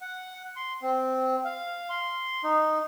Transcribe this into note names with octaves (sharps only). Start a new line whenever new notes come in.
F#5
C6
C4
F5
C6
D#4